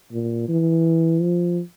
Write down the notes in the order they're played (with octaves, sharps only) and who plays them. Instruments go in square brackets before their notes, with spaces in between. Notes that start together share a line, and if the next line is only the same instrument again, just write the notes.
[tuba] A#2
E3
F3